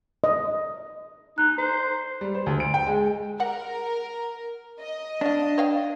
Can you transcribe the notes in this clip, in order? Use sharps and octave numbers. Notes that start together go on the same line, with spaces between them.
D#5
D#4 F#6
C5 A#5
G3
C5
D2
D7
G5
G#3
G3 A#4 F#5
D#5
C#4 D4 F5
C#5 F5 G5